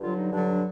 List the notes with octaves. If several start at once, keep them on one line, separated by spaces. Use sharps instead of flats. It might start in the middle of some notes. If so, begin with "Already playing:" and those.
G2 D3 F#3 F4
D#4
G2 D3 F#3 D4
D4